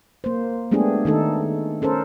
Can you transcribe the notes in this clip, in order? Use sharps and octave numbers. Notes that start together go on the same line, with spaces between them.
A#3 C5
G#3 A3 B3 D4 G4 G#4
D#3 A3 D#4 A4
C#4 A4 A#4 C5